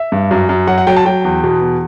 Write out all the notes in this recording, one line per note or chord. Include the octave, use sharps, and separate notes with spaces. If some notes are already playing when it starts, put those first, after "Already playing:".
Already playing: E5
G2
F#2
F#2
F#3 F#5
F#5
F#3 G5
A5
F#3 G5
E2
B2
E2